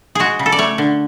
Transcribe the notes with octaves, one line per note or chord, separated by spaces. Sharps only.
G#3 F#4 G#4
C#3
A4
D5
A3 C#5
D3